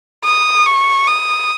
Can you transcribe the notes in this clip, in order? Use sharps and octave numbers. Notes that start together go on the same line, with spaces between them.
D#6
C#6
D#6